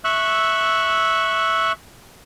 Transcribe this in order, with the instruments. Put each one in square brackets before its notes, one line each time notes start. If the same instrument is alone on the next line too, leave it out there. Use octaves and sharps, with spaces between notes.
[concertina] E5 C#6 E6 F#6